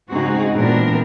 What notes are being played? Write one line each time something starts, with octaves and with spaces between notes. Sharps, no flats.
G#2 C#3 C4 D#4 F#4 G#4
A#2 E3 B3 C4 D4 A#4